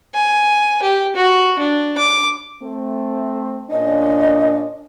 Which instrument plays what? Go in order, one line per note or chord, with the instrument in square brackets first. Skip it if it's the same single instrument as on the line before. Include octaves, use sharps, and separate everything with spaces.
[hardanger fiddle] G#5
G4
F#4
D4
D6
[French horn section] A3 C4
[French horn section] A#2 C#4 D4 [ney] D#5